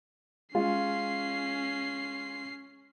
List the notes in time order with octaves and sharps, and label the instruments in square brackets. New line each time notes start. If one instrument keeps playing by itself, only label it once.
[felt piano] G#3 F4 [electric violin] C#4 C7